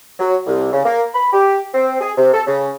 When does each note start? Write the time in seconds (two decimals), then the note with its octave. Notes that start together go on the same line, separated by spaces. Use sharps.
0.19 F#3
0.46 C2
0.73 C#3
0.85 A#3
1.14 B5
1.33 G4
1.74 C4
2.01 G#4
2.17 C3
2.33 A4
2.47 C#3